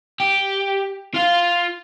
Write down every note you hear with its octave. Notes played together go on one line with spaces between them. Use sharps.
G4
F4 F5